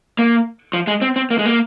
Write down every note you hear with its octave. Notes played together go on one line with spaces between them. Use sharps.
A#3
F3
G#3
C4
C4
A#3
G#3
A#3